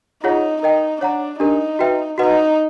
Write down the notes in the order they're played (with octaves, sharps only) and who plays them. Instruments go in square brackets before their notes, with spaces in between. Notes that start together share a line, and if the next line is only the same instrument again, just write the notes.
[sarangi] D#4 [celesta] F4 G#4 C#5 F#5
[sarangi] D#4 [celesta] A#4 D#5 G5
[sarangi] D4 [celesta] C#5 F#5 A#5
[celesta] D4 G4 A#4 [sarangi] D#4
[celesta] F#4 B4 E5 G5
[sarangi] D#4 [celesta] F#4 B4 D#5 F#5